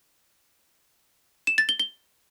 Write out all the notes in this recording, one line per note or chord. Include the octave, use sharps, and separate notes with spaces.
E7
A6
G7
G7